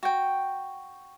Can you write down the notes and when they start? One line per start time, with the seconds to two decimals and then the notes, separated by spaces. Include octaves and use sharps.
0.03 F#4 G5